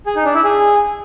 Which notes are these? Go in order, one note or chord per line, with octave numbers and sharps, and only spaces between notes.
G#4
D#4
D4
E4
G#4